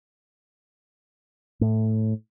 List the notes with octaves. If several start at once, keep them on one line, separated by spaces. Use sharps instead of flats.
A2